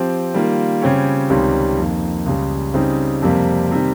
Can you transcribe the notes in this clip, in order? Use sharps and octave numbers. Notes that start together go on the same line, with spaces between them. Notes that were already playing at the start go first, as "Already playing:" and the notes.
Already playing: F3 C4 G4
D#3 G3 A#3 F4
C#3 G3 C4 G4 C#5
C#2 C3 D#3 G3 C#4
F2 D#3 A#3
C#2 C#3 G3
C#3 G3 C4 D#4
F2 C3 G3 A#3
C3 D#3 G3